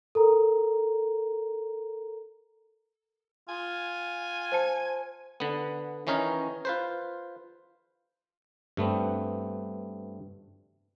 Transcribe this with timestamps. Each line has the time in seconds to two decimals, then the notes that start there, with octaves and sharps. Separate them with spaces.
0.15 A4 A#4 A#5
3.48 F4 G#5
4.52 C5 A5 C#7
5.40 D3 B3
6.07 D#3 E3 C#4 D#4 A#4 C#5
6.65 F4 B4 C5
8.77 G2 A3 B3 C4